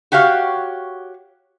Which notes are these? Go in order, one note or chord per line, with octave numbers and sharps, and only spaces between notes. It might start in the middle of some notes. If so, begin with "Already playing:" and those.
F#4 G4 C#5 F5 F#5